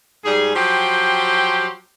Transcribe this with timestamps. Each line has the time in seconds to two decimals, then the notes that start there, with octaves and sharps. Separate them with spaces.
0.24 G#2 G3 G#4
0.55 F3 F#3 G4 G5 C6